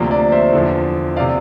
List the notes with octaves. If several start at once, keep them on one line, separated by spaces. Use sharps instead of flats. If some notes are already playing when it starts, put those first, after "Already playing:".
Already playing: D2 C3 F3 A#3 D4
D5
C5 E5
E2 D3 F3
D5 F5
C3